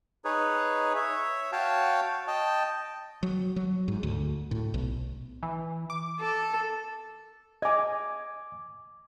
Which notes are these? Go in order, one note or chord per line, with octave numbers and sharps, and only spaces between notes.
D#4 G#4 B4 C#5
C#5 E5
F#4 C#5 F5 G5 A5
D#5 G5 A5
F#3
F#3
G#2
D2
A2
B1
E3
D6
A4
D#5 G#5 D6 G#6